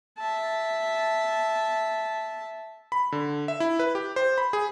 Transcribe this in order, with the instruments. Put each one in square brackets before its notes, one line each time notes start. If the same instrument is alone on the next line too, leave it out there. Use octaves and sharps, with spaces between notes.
[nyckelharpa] E5 A5
[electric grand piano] B5
D3
E5
E4
B4
G4
C5
B5
G#4